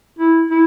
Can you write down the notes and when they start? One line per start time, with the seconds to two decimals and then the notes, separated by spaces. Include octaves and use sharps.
0.19 E4
0.50 E4